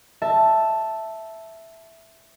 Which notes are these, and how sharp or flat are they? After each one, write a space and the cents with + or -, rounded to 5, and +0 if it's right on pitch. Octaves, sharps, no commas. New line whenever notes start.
E5 +0 A5 +0